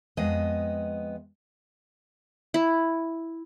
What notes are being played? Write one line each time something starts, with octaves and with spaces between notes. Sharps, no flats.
F2 G#3 B3 D#5
E4